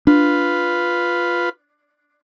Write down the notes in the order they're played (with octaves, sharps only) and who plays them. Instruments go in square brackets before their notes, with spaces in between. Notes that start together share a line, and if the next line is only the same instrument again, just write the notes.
[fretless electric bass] D4 [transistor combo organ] F4 B4